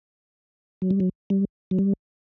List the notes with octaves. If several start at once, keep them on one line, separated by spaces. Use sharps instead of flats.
F#3
G3
F#3
G3
F#3
G3